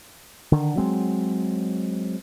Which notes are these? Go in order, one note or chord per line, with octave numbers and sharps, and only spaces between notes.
D3 D#3
F#3 G#3 C4